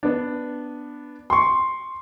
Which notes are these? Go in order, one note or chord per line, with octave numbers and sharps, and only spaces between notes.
B3 D4
C6 C#6